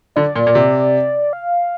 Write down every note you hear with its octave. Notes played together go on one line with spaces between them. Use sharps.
D3 D5
A#2
A#2
C3
F5